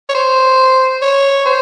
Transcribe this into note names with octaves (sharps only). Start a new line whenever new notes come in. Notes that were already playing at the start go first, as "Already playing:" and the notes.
C#5
C5
C#5
C5